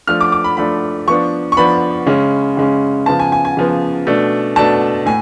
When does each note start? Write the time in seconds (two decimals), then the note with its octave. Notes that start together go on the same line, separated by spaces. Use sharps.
0.07 F3 A3 D4 F6
0.21 D6
0.32 D6
0.44 B5
0.57 F3 A3 D4 B5
1.08 F3 B3 D4 C#6
1.52 C#6
1.57 F3 B3 D4 B5
2.07 C#3 G#3 C#4
2.57 C#3 G#3 C#4
3.06 C#3 F3 B3 A5
3.19 G#5
3.32 G#5
3.45 G#5
3.57 C#3 F3 B3
4.07 B2 A3 D4
4.56 B2 A3 D4 A5
5.06 A2 G#5